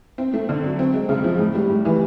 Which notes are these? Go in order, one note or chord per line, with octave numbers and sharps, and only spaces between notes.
C4
A3
D3
F#3
C4
G#3
C#3
F3
A2
G3
A2
E3